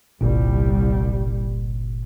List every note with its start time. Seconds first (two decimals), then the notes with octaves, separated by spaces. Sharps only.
0.21 G1 C2 A#2 G3